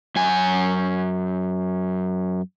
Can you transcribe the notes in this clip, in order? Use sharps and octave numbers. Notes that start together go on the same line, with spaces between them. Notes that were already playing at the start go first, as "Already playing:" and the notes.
F#2 G#5